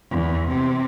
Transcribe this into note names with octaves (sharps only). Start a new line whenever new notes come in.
E2
C3